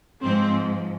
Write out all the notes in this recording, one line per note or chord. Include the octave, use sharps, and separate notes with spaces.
G#2 F3 C4